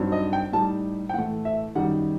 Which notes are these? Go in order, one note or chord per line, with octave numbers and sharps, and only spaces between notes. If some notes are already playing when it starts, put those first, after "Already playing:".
Already playing: G2 F#3 C4 D#4
D#5
G5
A2 G3 D#4 A5
G5
A2 E3 A3 F#5
E5
F#2 D#3 G3 D#4 F#5